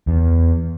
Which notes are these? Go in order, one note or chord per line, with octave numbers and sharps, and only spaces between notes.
E2